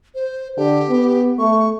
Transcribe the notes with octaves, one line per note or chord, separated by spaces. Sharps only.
C5
D3 G4
B3
A3 C#6